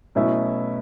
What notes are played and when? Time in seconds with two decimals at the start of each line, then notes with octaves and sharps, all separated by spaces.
0.15 B2 F#3 A3 C#4 E4